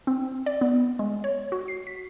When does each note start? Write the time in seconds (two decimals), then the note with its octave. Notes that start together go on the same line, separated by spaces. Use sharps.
0.07 C4
0.46 D5
0.61 B3
0.99 G#3
1.24 C#5
1.52 F#4
1.68 C7
1.87 B6